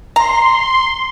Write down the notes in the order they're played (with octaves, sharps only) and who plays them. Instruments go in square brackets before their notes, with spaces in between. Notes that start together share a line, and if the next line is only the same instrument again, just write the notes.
[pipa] A#5 [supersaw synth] C6